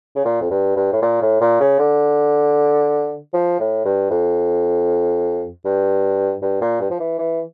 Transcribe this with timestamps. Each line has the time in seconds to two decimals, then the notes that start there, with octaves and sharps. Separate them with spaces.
0.15 C#3
0.25 A#2
0.41 F2
0.51 G2
0.76 G2
0.92 A2
1.02 A#2
1.21 A2
1.41 A#2
1.60 C#3
1.79 D3
3.34 F3
3.59 A2
3.85 G2
4.10 F2
5.65 G2
6.42 G2
6.61 A#2
6.80 G2
6.90 F3
7.00 E3
7.19 E3